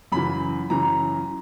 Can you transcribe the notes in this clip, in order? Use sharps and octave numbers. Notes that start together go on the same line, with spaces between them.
F#2 C#3 E3 B5
F#2 C#3 E3 A#5